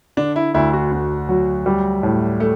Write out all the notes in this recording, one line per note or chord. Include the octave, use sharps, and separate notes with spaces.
D3 D4
E4
D2 E4
F#4
D2
F#3
G3
A2
A3